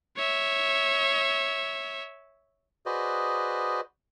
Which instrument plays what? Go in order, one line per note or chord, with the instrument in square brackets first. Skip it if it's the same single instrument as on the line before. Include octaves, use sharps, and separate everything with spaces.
[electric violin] C#5 E5
[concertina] F#4 G#4 B4 C5 D5 D#5